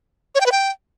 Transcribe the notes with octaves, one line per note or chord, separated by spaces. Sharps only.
C#5
G5
B4
G5